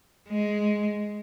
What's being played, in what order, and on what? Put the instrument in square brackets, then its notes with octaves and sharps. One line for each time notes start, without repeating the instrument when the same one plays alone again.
[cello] G#3